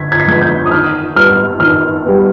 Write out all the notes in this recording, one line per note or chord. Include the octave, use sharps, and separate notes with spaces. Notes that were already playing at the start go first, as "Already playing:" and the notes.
Already playing: D3 G#6 B6
G#6
B6
F3 G#3 B3 G#6
G6
D#6
D#3 F6
G3 B3 F6
D#3 F6
G3 B3